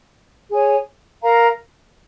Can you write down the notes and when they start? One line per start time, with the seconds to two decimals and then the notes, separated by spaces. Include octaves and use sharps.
0.52 G#4 C#5 G#5
1.23 A#4 F5 A#5